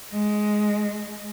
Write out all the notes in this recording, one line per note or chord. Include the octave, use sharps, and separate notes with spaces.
G#3